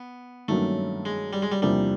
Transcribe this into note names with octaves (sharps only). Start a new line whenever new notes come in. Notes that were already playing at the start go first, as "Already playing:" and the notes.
Already playing: B3
G2 D#3 F#3 A3 A#3 C#4
G#3
G3
G#3
G3
E2 C3 F3 G3 A#3 D4